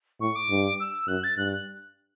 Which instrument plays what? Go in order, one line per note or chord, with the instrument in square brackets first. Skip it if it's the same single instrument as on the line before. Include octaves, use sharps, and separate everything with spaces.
[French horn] A2 [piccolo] C#6
[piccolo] D6
[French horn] G2
[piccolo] E6
[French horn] F#2 [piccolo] F#6
[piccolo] A6
[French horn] G2 [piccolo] F#6
[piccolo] F#6